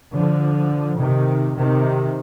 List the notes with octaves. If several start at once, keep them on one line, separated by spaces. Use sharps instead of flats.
D3 F3
C3 D#3
C3 D#3